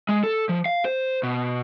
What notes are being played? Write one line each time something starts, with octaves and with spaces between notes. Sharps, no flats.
G#3
A4
F3
F5
C5
B2